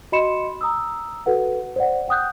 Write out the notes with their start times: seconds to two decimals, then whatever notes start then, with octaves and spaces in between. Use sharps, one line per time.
0.12 F#4 D#5 B5 C6 C#7 E7
0.61 A#5 D#6 E6
1.26 F#4 A4 B4 F#5
1.76 C5 D5 F#5
2.08 F#5 G5 D#6 F#6 G6